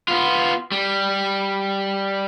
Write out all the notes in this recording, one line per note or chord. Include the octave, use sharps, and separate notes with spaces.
B3 F4
G3